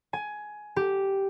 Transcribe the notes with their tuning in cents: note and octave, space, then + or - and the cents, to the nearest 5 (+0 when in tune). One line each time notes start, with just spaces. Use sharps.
G#5 +15
G4 -5